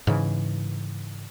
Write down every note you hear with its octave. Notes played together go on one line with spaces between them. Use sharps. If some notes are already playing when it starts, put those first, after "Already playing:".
G#2 C#3 E3